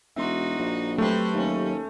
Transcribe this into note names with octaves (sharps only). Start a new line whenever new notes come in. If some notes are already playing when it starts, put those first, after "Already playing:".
E1 D#4 F#4 E5 C6
A#1
F#3 A3 C4 G4 B4 C5
D#2 C#4